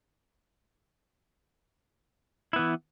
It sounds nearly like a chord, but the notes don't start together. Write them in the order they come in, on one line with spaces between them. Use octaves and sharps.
E4 B3 E3